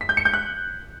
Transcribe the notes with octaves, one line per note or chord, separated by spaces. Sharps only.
B6
G6
C#7
G6
F#6